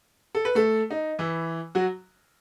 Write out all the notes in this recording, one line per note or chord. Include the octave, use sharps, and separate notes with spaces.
A4
B4
A3 A4
D#4
E3 E4
F#3 F#4